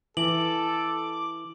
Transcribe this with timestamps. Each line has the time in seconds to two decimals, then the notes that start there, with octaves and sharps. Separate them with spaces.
0.17 E3 A4 D6 F#7